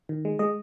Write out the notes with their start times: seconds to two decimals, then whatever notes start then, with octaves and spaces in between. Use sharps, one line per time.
0.09 D#3
0.25 G#3
0.39 G#3 D#5